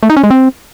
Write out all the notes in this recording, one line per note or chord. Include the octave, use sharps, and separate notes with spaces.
A3
D#4
C#4
G#3
C4